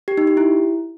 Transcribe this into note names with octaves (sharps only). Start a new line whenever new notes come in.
G4
D#4
G4
E4